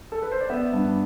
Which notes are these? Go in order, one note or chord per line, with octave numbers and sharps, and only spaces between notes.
A4
B4
C5
D5
B3 E5
G2